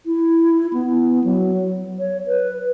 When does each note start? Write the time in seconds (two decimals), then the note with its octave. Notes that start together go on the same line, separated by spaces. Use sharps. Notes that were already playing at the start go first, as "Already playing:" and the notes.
0.06 E4
0.73 B3
1.24 F#3
1.99 C#5
2.27 B4